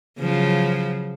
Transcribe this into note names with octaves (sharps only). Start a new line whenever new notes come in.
C#3 F3 F#3